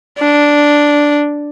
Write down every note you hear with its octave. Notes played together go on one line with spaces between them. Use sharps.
D4